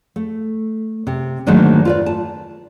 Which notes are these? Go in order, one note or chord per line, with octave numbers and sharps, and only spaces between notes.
A3
C3
G#2 D3 D#3 F#3 A3 A#3
F4 B4 D5
A5